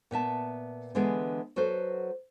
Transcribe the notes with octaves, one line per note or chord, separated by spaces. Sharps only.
A#2 B3 E5 A5
D3 E3 G#3 B3 G#4
F#3 F#4 A4 B4 C5